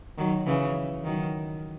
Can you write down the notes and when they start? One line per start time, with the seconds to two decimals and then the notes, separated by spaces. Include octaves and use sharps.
0.18 D#3 F#3
0.46 C#3 E3
1.04 D#3 F#3